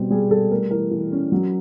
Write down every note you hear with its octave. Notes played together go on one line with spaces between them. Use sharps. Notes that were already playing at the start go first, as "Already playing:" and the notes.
Already playing: B2 G3 C4
G3 G#4
G3 A4
A3 A#4
E3 A#4
E3
C#4
F#3